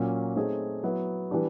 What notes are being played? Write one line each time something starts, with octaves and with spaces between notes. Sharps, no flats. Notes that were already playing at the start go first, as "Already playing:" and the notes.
Already playing: A#2 F#3 A#3 C#4
A3 C4 D#4 G#4 C#5
F#3 B3 E4
E3 G3 B3 D4 G4